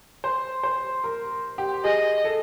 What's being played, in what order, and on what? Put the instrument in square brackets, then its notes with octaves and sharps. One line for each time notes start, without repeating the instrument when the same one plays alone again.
[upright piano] C5
C5
A#4
G4
[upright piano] G#4 [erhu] D#5
[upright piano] A4